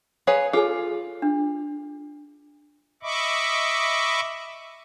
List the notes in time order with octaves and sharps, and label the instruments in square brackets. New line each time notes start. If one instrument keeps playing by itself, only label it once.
[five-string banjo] G#4 B4 C#5 [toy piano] F5
[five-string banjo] F4 [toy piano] G#4 A4 G#5
[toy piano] D4
[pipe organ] D#5 E5 B5 C#6 D6